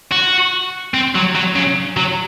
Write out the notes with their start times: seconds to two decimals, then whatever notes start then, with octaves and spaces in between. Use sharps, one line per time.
0.12 F#4
0.94 C4
1.15 F#3
1.35 F#3
1.56 C#3
1.97 F#3